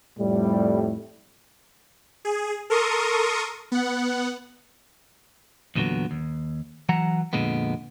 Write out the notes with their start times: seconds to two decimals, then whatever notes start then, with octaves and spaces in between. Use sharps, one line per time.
0.18 F2 A2 G3
2.25 G#4
2.70 A4 A#4 C6 C#6 D#6
3.72 B3 F#5
5.75 E2 A#2 D3 F#3 B3
6.11 D#2
6.89 E3 F#3 F#5 A#5
7.33 F2 A#2 D3 G#3 B3